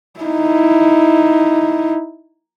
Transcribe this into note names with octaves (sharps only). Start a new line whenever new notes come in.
D#4 E4